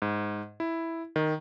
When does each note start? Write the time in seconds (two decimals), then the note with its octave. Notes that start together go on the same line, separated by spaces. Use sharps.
0.02 G#2
0.60 E4
1.16 D#3